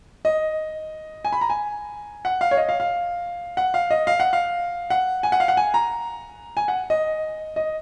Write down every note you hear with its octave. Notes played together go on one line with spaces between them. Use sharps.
D#5
G#5
B5
A#5
G#5
F#5
F5
C#5
D#5
F5
F5
F#5
F5
D#5
F5
F#5
F5
F#5
G#5
F#5
F5
F#5
G#5
A#5
G#5
F#5
D#5
D#5